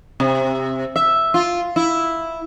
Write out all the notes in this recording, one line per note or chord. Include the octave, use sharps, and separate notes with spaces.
C3
E5
F4
E4